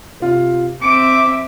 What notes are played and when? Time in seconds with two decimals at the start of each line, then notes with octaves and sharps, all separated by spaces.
0.20 C3 F4
0.82 C4 E5 D6 C#7 D7